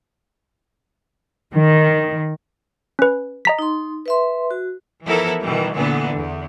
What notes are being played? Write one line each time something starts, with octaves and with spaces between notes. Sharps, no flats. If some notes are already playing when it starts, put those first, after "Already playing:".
D#3
C#4 B4
D#5 A#5 B6
D#4 C6
B4 E5 C6
F#4
E3 F3 B3 E4 A4 A#4
B2 D#3 E3 G3
A#2 D3 E3 B3
E2